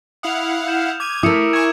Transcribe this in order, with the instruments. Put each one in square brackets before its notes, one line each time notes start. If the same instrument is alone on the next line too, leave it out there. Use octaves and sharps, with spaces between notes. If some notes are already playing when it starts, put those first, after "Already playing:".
[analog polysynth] E4 F5 F#5 [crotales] D#6 F7
[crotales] F6 G6 E7
[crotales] D6 D#7 [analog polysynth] G#6
[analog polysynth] A3 [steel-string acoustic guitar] E4 A#4 [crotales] D#6 E6 C#7
[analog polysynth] G#5 C#6 [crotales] G#6 E7